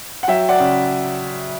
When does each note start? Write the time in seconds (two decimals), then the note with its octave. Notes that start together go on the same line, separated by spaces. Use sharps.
0.23 F#5
0.28 F#3 E5 G5
0.49 D5 F#5
0.60 C#3